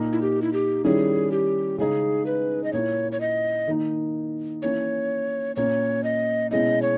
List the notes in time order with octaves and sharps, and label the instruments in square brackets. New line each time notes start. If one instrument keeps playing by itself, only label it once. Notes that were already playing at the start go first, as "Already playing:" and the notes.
Already playing: [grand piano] A#2 A#3 D#4
[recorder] E4
G4
E4
G4
[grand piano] D#3 G3 C#4 E4 [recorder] G#4
[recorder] G4
[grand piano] C#3 G#3 D#4 [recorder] G#4
[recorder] B4
D#5
[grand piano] A#2 A#3 E4 [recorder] C#5
[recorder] C#5
D#5
[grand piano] D#3 A#3 D#4
[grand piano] E3 A#3 C#4 E4 [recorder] C#5
[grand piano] A#2 A#3 C#4 [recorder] C#5
[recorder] D#5
[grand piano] B2 G#3 C#4 E4 [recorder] D#5
[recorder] C#5